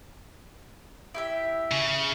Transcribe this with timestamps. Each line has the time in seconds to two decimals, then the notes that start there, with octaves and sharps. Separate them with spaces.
1.14 E4 G4 E5
1.72 C#3